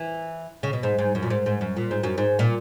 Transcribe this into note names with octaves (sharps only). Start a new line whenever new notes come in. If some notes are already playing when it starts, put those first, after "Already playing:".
Already playing: E3
C#3
B2
G#2
G#2
F#2
A#2
G#2
G#2
F#2
A#2
G#2
F#2
G#2
A#2